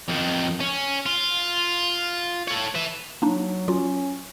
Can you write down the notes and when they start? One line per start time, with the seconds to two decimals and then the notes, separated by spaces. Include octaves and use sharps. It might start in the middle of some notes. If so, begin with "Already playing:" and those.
0.09 F2 D#3
0.61 C#4
1.06 F4
2.48 A4 C#5
2.75 B4 E5
3.22 F#3 A#3 D4 D#4
3.68 F#3 C#4 F4 F#4